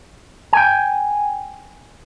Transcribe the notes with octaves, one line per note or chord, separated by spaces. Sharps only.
G5 G#5